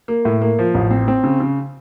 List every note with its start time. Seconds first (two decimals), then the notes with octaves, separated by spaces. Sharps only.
0.08 A#3
0.25 A2
0.42 A#3
0.59 F3
0.74 A1
0.91 C4
1.08 C4
1.24 C#3
1.40 C#3